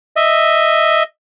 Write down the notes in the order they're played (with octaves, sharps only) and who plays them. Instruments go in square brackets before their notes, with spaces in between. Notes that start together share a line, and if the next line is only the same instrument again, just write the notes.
[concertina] D#5 E5